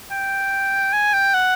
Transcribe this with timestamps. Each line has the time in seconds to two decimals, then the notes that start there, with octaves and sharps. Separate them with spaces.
0.11 G5
0.93 G#5
1.13 G5
1.34 F#5